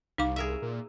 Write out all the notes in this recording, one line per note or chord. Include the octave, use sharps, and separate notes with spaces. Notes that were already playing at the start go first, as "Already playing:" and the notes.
C2 D#4 F5 D6
G#4 A#4 E5
A#2